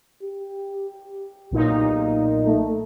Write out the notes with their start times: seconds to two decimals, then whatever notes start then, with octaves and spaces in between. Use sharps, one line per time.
0.23 G4
1.51 B1 A#2 D#4
2.46 A3